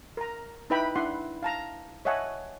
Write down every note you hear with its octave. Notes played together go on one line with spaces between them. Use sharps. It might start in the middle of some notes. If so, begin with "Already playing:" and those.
A#4 A#5
D#4 E4 B4 E5 G5 B5
D4 E4 F#5 C6
F5 A5 A#5
C#5 D#5 E5 F#5 G#5 A5